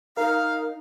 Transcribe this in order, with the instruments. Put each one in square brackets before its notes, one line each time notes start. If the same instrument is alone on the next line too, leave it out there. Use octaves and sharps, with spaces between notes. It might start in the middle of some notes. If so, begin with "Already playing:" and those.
[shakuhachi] D#4 [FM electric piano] A#4 [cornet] F5